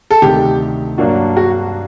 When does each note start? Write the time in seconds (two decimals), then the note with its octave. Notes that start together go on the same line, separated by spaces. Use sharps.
0.11 A4
0.22 D2 C3 D#3 G4
0.98 G2 F#3 A#3 D4 F#4
1.37 F#4